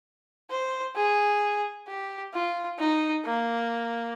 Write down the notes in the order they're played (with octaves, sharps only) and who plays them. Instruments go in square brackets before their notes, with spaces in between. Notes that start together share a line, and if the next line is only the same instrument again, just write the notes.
[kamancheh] C5
G#4
G4
F4
D#4
A#3